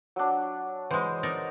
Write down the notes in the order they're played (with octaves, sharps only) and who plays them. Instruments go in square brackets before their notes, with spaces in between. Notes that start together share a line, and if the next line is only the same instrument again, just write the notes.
[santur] F#3 D4
[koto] E3 G#3 [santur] C5 D#5
[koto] D#4 A#4 D5